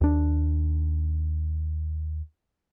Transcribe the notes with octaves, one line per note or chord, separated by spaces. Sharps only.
D#2 D4